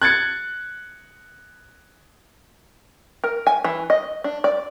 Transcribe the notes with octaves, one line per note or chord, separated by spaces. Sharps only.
F#6 G#6 A6 C#7
A#4
G#5
E3
D#5
D4
D5